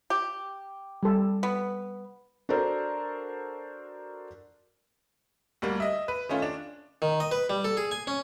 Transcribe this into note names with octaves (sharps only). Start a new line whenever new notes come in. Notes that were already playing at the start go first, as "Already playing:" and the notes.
G4
G3 A4
B3
D4 F#4 A4 A#4 C5
D2 G3 A#3
D#5 E5
B4
D#3 A3 C#4 F4
D4
D#3
D#5
B4
G3
A4
G#4
G#5
C#4